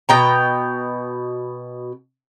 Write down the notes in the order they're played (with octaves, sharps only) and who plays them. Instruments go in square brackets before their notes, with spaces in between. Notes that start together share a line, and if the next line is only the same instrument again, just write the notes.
[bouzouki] B2 G5 A#5